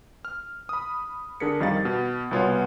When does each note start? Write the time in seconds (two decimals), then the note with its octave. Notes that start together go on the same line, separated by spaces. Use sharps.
0.25 F6
0.69 B5 D#6
1.40 D3 D4 G#4 A#4 B6 C#7
1.60 F2 D#3 G3 F5 A6
1.85 B2
2.31 C2 B2 B3 F4 C#5